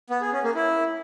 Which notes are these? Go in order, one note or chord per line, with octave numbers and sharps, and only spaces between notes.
B3
G#4
C#4
A#3
E4